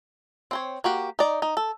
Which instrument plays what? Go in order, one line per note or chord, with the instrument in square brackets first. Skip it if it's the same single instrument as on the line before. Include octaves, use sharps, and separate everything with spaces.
[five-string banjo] C4 C5 C#5
A#3 F#4 G4
D#4 D5
D#4
A4